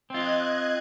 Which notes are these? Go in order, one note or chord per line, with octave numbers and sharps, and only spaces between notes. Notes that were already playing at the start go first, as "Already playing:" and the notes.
C4 F4 D#5 F#6 G#6